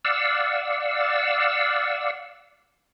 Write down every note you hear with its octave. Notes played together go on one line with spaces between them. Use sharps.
D5 F5 F#5 E6